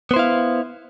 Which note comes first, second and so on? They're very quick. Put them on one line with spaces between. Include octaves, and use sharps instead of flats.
B3 C5 E4 F5